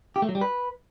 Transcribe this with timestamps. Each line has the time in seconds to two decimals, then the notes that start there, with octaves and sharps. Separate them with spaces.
0.16 G4
0.22 A3
0.29 F#3
0.35 G3
0.41 B4